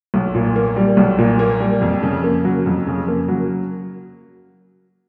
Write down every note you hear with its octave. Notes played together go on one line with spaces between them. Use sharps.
B1
A#2
A#3
G3
B1
A#2
A#3
G3
F2
C#3
A#3
F#3
F2
C#3
A#3
F#3